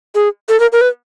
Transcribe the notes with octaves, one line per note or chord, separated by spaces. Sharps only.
G#4
A4
A#4
A#4
B4